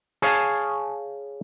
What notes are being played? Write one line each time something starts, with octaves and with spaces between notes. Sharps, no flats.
G#4 C#5 F5 G#5 A5